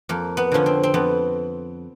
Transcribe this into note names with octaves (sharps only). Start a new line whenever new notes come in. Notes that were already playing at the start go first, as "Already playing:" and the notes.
F2 A#3
B3
D3 F3 C#4
C4
C4
F2 B3